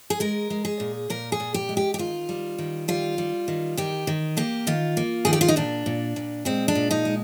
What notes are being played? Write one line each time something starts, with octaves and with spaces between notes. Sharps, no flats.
G#4
G#3 A#4
G#3
G#4
A#2
A#2 A#4
G#4
A#2
G4
G#3
G4
G4
D#3 F4
G3
D#3
G3 F4
G3
D#3
D#3 G4
D#3
A#3 G4
D#3 F4
A#3
D#3 G#4
G4
F4
D#4
A#2 D4
A#2
A#2
G#3 C4
D4
A#2
D#4
G#3